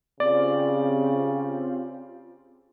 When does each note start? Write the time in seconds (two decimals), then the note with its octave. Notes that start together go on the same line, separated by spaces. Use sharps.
0.20 C#3 C4 F4 G4 D5